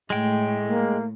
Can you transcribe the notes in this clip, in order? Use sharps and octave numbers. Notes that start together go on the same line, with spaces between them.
A2 G#3 G5
A#3